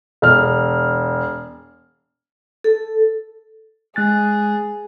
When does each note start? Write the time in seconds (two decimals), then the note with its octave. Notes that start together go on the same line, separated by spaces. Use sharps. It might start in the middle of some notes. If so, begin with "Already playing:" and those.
0.22 E1 F6
2.64 A4
3.96 G#3 G#4 F#6 A6